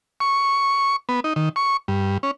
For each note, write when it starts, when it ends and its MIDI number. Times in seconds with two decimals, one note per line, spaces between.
0.20 0.96 85
1.09 1.20 59
1.24 1.33 63
1.36 1.49 51
1.56 1.77 85
1.88 2.17 43
2.23 2.31 61